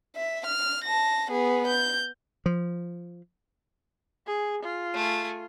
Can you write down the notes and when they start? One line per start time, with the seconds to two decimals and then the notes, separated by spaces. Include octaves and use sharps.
0.17 E5
0.46 F6
0.84 A5 A#6
1.30 B3 G#4
1.67 G6
2.46 F3
4.27 G#4
4.63 F4
4.94 A3 G#5